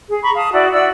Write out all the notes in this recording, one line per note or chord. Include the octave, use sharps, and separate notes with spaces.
G#4
A#5 B5 C#6
F5 A5 D#6
E4 F#4 D5
E4 F#4 D5 E6